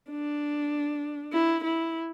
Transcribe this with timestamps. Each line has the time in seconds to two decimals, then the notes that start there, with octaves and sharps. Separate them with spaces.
0.10 D4
1.33 E4
1.64 E4